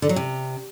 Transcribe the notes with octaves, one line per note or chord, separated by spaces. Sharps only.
D3
F#3
C3